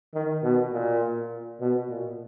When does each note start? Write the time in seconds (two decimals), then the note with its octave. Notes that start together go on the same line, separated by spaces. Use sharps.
0.14 D#3
0.43 B2
0.72 A#2
1.60 B2
1.90 A#2